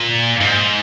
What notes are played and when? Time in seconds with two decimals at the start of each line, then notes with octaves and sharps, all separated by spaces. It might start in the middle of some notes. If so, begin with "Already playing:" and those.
Already playing: A#2
0.41 G#2